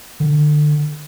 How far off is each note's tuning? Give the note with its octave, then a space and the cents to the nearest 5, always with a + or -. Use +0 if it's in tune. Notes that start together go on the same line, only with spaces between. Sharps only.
D3 +25